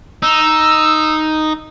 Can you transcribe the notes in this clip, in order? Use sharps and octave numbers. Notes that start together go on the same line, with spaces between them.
D#4 E6